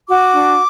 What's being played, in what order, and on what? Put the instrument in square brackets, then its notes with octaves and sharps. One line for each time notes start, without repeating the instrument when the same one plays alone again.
[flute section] F#4 D6
D4